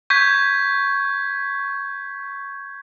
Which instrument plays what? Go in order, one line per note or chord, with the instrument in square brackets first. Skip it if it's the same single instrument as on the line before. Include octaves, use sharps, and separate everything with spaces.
[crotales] C#6 G6 G#6 B6